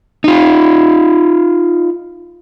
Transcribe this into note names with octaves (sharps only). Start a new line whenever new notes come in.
D#4 F4